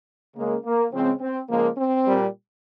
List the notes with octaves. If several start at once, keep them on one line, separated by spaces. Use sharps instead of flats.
C#3 G#3 A#3
A#3
C#3 F3 G#3 C4
C4
C#3 F3 G#3 A#3
C4
A#2 G3